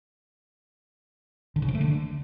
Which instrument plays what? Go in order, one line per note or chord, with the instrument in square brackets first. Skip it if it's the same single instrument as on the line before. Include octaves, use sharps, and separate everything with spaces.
[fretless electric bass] D3
C#3
F3
A3
D3